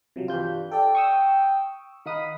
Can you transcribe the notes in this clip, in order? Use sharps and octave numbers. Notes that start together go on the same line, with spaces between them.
C3 F3 F#3
G2 E3 F4 G6
A4 D5 G5
C#6 D#6 E6
D#3 D#4 F5 F#5 B5 D#6